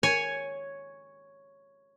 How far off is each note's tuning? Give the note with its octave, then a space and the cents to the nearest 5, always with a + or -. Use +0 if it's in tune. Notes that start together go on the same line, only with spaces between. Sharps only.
C#5 +0 G#5 +0